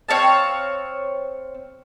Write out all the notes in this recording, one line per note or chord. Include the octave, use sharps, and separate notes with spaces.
C4 C#5 F5 A5